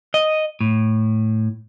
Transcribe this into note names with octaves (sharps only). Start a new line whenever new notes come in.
D#5
A2